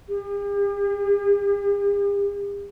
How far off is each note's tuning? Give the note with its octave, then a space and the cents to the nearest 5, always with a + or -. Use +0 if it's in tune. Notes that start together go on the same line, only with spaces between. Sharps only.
G4 +45